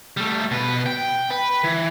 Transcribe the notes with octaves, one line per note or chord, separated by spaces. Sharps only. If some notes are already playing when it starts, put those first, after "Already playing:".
G3 A3
B2 B4
G5
B4
E3